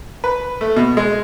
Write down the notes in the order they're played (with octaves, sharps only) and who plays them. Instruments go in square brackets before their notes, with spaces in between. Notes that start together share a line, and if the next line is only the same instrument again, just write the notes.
[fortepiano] B4
A3
B2
G#3